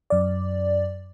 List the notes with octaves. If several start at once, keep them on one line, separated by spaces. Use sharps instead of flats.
F#2 D5